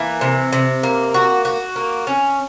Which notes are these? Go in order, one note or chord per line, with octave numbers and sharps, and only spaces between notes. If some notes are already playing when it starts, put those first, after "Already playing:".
Already playing: E3 A#3
C3
C3
A#3
F#4
F#4
A#3
C#4